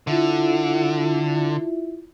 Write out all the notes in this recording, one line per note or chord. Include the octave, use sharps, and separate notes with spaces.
D3 E4 F4 E5